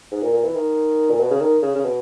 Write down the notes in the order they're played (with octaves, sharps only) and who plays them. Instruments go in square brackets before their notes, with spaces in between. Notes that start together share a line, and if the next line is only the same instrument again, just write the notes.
[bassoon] G#2
A#2
A#2
E3
D#3
A#2
B2
C#3
D#3
C#3
C#3
B2